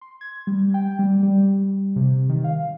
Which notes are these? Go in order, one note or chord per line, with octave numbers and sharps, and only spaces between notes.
C6
G#6
G3
G5
G3
G3
C3
D#3
F5